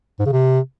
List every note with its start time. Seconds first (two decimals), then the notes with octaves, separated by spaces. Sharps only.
0.19 G#2
0.26 C#3
0.32 C3